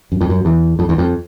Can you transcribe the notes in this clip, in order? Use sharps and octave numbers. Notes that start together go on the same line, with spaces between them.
F#2
F2
F#2
E2
F2
E2
F2